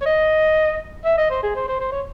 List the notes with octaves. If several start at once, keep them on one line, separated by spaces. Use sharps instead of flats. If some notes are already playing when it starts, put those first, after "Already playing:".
C#5
D#5
E5
D#5
C5
G#4
C5
C5
C5
C#5